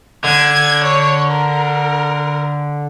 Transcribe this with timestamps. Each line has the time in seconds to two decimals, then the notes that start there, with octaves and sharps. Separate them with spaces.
0.24 D3 G#6
0.84 C#5
1.30 A#4